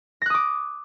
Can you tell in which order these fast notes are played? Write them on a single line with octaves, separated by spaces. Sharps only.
A#6 F#6 D#6 D6